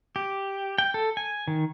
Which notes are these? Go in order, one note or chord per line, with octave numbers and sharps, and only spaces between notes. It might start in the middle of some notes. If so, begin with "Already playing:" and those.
G4
G5
A4
G#5
D#3